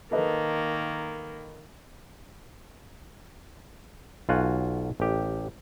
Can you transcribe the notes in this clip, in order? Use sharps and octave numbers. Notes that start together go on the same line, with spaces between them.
D#3 A#3 A4 B4 D#5
B1 F4 F#4 F#5 G#5
A1 G4